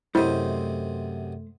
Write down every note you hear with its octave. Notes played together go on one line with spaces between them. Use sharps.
F#2 C3 A3 E4 C5 D#5